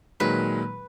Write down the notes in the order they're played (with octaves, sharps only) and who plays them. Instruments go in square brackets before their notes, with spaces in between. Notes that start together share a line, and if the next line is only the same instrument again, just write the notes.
[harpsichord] A#2 [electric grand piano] D#3 F#3 G#3 [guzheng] B4